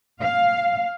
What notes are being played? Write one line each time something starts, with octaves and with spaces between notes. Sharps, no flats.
F5